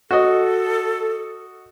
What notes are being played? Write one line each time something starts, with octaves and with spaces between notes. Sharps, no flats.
F#4 A4 D#5